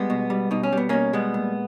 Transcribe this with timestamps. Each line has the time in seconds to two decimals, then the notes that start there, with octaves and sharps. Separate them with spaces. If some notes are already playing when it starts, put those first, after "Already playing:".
Already playing: G3 G#3 B3
0.10 B2
0.30 G3
0.51 B2 D#4
0.63 C#4
0.73 G3 B3
0.89 B2 A#3 C#4
1.13 G3 G#3 B3
1.34 A#2